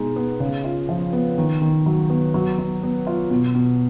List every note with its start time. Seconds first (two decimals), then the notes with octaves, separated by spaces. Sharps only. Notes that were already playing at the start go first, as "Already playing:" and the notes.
Already playing: B2 G#3 D#4
0.16 B3
0.40 C#3
0.64 F4
0.89 F3
1.13 B3
1.38 D#3
1.62 D#3
1.86 F#3
2.10 B3
2.34 F#3
2.58 F#3
2.83 B3
3.07 F4
3.30 B2
3.55 B2